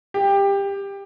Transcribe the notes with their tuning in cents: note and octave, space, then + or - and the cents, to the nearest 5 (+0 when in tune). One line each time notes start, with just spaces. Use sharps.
G4 +20